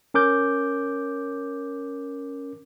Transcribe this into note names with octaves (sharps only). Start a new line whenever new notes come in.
C#4 A#4 D6 G6